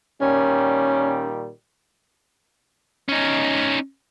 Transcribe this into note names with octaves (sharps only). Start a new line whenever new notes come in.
A#2 D#3 G3 C#4
C#4 D#4